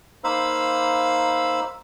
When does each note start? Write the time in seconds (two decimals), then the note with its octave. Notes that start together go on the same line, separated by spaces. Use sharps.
0.24 A#3 D#4 C5 F5 B5 E6